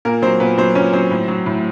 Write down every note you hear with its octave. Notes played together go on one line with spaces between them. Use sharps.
A#2 A#3 A#4
F#3 C4 C5
A#2 B3 B4
F#3 C4 C5
A#2 C#4 C#5
F#3 C4 C5
A2
F#3
A2